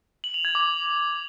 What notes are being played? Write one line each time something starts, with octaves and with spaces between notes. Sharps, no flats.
F#7
F7
G#6
D6